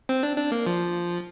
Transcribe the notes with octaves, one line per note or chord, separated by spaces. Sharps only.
C4
D4
D4
A#3
F3